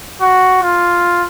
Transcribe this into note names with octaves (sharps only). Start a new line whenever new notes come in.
F#4
F4